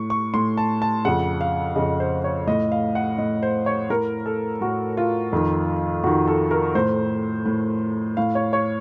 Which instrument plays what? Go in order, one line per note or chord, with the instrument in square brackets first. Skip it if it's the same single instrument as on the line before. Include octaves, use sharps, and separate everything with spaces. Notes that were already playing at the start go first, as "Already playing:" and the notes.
Already playing: [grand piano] A2 C#6
C#6
A2 C6
A5
A5
F2 C#3 F#5
F5
F2 C#3 D#5
C5
C#5
A2 D#5
F5
F#5
A2 D#5
C5
C#5
A2 A#4
A4
A2 F#4
F4
F2 D#3
F2 D#3 F#4
A4
A#4
A2 C5
A2
A2 F5
C#5
C#5